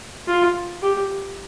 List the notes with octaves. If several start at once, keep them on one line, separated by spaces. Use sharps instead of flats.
F4
G4